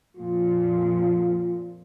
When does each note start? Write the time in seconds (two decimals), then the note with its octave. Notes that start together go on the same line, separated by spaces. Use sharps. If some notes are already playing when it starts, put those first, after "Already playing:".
0.17 F2 A#2 F3 F4